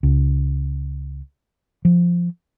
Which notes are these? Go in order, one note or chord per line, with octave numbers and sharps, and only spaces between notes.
C#2
F3